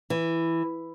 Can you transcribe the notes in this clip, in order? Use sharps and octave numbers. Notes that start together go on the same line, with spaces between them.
E3